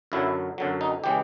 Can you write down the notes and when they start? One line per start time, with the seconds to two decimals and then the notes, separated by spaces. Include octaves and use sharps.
0.12 F#2 D3 F#3 E4
0.58 F#2 D3 F#3
0.81 D#4
1.04 C#3 E3 G#3 G4